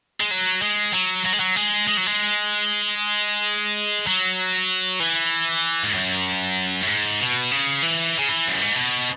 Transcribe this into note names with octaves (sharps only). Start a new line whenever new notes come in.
G#3
F#3
G#3
F#3
F#3
G#3
F#3
G#3
G#3
F#3
G#3
F#3
E3
G#2
F#2
F#2
G#2
B2
C#3
E3
C#3
E3
F#2
G#2
B2